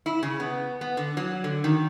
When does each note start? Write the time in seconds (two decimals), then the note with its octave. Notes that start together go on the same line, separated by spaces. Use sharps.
0.06 E4
0.23 C#3
0.40 B3
0.81 B3
0.97 D3
1.17 F#3
1.44 D3
1.64 D#3